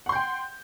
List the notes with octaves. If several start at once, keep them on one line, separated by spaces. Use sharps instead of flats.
F#5 G5 C6 G6